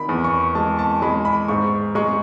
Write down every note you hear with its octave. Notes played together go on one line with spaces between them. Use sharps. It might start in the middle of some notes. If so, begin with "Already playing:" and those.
Already playing: D#3 B5
E2
C#6
G#3 A5
A5
G#3 B5
B5
G#2 C#6
G#3 C#6